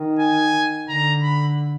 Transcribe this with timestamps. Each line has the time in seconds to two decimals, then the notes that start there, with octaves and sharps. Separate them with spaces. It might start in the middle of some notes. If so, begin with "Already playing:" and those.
Already playing: D#3
0.20 G#5
0.89 D3 A#5
1.22 B5